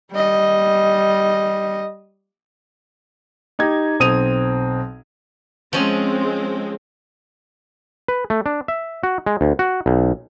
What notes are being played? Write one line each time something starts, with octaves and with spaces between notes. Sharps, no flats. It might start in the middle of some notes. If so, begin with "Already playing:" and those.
G3 D#5
D#4 G4 G#6
B1 C4 D#6 D#7 F7
F3 G#3 C4 C#4 G#5
B4
A3
D4
E5
F#4
G#3
D2
F#4
B1